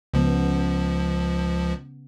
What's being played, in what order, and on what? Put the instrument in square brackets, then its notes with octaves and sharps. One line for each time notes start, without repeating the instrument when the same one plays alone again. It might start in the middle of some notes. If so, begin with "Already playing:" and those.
[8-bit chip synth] C#2 F3 [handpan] C#3 B3